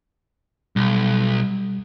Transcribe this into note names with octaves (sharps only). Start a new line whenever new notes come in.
B1 G3